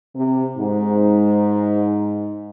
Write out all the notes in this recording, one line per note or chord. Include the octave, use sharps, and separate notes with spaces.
C3
G#2